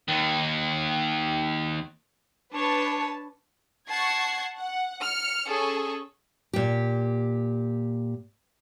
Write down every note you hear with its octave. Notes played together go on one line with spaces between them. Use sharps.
D#2 D#3
D4 B4 C#5 A5
F#5 A5 C#6 G#6 C7
F#5
F6 C#7
C#4 G#4 A4 C#6
A#2 G4